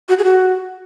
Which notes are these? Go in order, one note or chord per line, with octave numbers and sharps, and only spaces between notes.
F#4
G#4
F#4